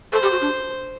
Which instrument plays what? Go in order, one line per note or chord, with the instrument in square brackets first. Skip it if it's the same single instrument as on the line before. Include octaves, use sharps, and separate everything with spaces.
[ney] A4 [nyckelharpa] C5
[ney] G4
F#4
D4